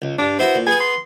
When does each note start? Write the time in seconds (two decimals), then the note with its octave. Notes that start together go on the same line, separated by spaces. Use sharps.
0.02 C#2
0.19 G2 D4
0.39 B3 E4 F#4 C5
0.55 A#2
0.67 B3 G#4 G#5
0.80 C6